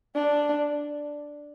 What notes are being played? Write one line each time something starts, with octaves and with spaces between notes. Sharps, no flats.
D4